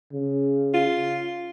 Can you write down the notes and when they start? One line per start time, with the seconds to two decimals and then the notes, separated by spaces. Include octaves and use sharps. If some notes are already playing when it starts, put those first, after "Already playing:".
0.13 C#3
0.74 F4